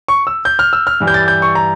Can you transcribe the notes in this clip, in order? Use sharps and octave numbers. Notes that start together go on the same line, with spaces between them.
C#6
E6
G6
F6
E6
F6
G2 E3 G3
G6
A6
G6
C#6
A#5